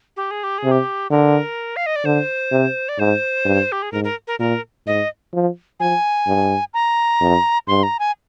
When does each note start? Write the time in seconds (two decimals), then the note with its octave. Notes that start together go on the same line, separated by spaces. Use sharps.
0.17 G4
0.31 G#4
0.43 G4
0.58 G#4
0.64 C3
0.71 G4
1.11 D3 A#4
1.76 F5
1.86 D#5
1.96 D5
2.05 D3 C5
2.52 C3
2.89 D5
2.99 G#2 C5
3.45 G2
3.72 G4
3.82 G#4
3.92 G#2 A#4
4.04 A#4
4.27 A#4
4.40 A#2 A#4
4.86 G#2 D#5
5.33 F3
5.80 F3 G#5
6.27 G2
6.74 A#5
7.21 F2
7.67 G2 C6
7.83 A#5
7.99 G#5